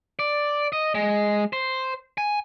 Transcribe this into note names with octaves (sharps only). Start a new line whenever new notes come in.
D5
D#5
G#3
C5
G#5